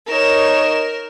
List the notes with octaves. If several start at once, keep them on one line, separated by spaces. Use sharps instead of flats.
D#4 A#4 C#5 E7